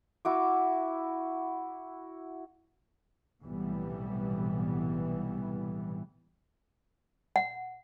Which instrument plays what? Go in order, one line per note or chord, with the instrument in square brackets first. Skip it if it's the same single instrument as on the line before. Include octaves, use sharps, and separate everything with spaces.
[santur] E4 F#4 D6
[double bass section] B1 A2 C3 E3 G3 B3
[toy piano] F#5